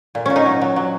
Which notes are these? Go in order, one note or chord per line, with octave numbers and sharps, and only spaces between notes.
A#2
A#2 C#4
D#4
F#3
F#3
F#3